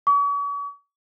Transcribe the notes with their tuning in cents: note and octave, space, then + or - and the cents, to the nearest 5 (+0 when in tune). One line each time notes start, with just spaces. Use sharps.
C#6 +45